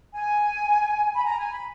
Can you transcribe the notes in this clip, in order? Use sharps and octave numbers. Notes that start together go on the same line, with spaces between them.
G#5
B5
A#5
G#5
B5